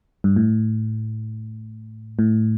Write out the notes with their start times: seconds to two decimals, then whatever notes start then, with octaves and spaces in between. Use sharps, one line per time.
0.24 G2
0.36 A2
2.19 A2